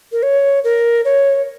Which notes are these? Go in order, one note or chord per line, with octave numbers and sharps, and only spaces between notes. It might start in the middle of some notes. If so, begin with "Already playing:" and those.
A#4
C#5
A#4
C#5